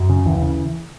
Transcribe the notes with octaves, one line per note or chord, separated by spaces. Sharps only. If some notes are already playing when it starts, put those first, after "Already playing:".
Already playing: F#2 F#3
C#3
D#2 E3
C#3